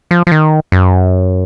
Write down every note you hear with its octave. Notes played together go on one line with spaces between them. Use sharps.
F3
F3
D#3
F#2